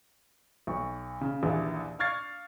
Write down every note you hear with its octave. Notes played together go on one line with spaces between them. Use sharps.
B1 C#6
C#3
A#1 D#2 E3
F5 C#6 F6 G#6 A6 C7